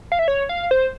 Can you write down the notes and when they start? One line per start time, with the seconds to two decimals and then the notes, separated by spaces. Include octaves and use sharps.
0.12 F5
0.19 E5
0.28 C#5
0.49 F5
0.71 C5